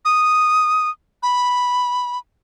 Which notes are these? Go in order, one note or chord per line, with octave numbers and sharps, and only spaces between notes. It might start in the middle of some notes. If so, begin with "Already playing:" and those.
D#6
B5